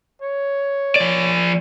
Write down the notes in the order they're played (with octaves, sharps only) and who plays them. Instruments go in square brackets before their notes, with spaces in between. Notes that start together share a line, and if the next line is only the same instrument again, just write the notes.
[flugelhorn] C#5
[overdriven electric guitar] F3 D5